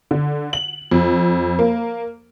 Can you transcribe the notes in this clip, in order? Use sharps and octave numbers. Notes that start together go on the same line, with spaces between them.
D3
F#7
F2
A#3